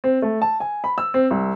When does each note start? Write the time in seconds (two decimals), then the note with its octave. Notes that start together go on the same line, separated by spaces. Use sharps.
0.04 C4
0.22 A3
0.42 A5
0.60 G#5
0.84 B5
0.98 E6
1.14 C4
1.31 C2